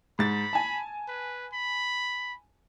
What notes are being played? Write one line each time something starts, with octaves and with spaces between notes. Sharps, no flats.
G#2 B5 A6
G#5 A5
B4
B5